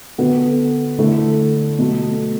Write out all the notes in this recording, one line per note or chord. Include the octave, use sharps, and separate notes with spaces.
D3 B3 F#4 A4
D3 A3 E4 A4
B2 F#3 A3